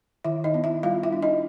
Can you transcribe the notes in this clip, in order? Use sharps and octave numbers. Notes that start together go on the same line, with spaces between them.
D#3 E4 E5
D#4 D#5
B3
E4 E5
G3 F4 F5
E4 E5
D4
D#4 D#5